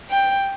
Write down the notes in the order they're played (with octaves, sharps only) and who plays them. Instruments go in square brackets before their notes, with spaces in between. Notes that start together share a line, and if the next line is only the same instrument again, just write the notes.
[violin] G5